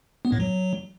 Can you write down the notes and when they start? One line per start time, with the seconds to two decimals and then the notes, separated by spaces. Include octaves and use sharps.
0.25 B3
0.32 A2
0.40 F#3